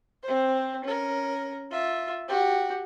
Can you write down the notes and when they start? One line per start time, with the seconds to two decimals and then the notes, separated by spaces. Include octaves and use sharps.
0.23 C4 C5
0.84 C#4 A#4
1.71 F4 E5
2.28 F#4 G4